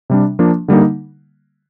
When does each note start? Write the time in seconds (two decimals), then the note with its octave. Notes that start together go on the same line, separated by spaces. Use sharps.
0.10 C3 G3 D4
0.39 F3 A#3 D4
0.68 D3 G3 A#3 D#4